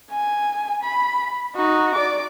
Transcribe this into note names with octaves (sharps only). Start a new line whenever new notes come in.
G#5
B5
D#4 F#4
D5 D6